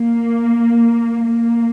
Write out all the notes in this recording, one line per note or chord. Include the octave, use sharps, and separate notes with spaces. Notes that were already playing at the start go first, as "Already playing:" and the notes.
Already playing: A#3
A#3